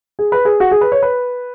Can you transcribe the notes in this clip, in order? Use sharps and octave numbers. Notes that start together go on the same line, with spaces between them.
G#4
B4
G#4
F#4
G#4
B4
C#5
B4